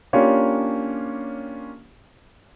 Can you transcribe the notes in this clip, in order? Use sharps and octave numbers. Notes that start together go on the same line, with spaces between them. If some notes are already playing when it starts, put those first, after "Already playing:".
A#3 C#4 D4 F4 G4 C#5